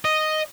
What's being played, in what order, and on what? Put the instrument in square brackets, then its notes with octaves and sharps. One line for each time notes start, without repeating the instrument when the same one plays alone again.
[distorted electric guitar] D#5